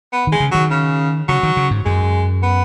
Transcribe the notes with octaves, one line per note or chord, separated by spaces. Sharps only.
B3
D#3
G#3
C#3
D#3 F#3
C#3
C#3 F#3
D#3
C#3
G#2
F#2 G#3
B3